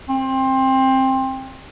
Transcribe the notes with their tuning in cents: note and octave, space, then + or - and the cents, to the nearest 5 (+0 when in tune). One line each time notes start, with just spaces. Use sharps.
C4 +20